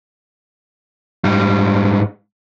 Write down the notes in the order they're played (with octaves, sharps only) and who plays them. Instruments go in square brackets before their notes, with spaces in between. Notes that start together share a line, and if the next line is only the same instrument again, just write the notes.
[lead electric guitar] G#2 G3